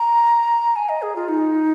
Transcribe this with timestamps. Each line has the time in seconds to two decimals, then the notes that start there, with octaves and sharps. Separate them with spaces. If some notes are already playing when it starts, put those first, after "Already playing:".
Already playing: A#5
0.76 G#5
0.89 D#5
1.02 G#4
1.16 F4
1.28 D#4